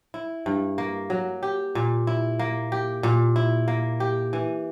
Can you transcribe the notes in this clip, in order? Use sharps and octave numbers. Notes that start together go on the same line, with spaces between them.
E4
G2
A#3
F#3
G4
A#2
E4
A#3
G4
A#2
E4
A#3
G4
E3